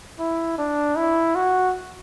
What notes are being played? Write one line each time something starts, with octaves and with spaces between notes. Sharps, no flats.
E4
D4
E4
F#4